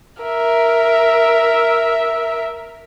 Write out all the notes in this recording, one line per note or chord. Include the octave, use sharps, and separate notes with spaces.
A#4 E5